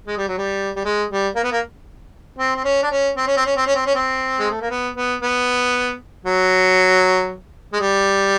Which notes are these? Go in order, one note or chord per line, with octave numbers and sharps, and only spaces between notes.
G#3
G3
F#3
G3
G3
G#3
G3
A#3
B3
A#3
C4
C4
C#4
D4
C#4
C4
C#4
C4
C#4
C4
C#4
C4
C#4
C4
G#3
A3
A#3
B3
B3
B3
F#3
G#3
G3